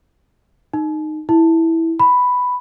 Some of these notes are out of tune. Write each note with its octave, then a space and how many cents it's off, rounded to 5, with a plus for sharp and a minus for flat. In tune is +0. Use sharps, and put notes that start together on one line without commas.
D#4 -15
E4 -10
B5 +5